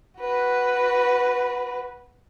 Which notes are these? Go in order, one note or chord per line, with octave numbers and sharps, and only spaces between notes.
F#4 B4